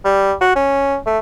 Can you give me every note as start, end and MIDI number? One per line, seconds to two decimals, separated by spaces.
0.05 0.33 55
0.41 0.53 66
0.55 0.97 61
1.06 1.19 57